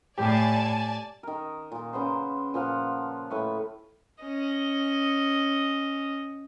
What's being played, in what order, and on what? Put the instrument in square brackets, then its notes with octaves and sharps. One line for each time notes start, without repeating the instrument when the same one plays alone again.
[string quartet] A2 [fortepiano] G4 [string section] D5 G#5 A5
[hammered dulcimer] D#3 A#4
A#2
C#3 B3 C5
A#2 F3 F5 F#5
A2 B4 B5 C#6
[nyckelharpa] C#4 D#5